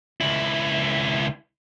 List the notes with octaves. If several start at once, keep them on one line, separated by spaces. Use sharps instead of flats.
C#2 E4